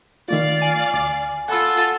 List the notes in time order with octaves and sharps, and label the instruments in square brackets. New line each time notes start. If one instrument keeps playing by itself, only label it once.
[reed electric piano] D#3 A3 F4 [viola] D5 F5
[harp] G#5
[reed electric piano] D2 D6
[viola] F4 A4 [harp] F#5 E6 [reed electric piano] G#5 A5 B5